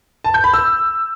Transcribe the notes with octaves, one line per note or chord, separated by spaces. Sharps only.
A5
G6
B5
E6